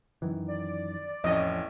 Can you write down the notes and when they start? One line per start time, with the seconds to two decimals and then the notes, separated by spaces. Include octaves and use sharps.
0.22 F#2 D#3 E3
0.47 D5
1.24 A1 F2 A2 C#4 D#5